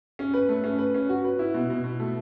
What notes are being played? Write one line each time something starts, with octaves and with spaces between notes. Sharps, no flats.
C#4
B4
A3
C#4
B4
C#4
F#4
B4
E4
B2
B2
B2
A3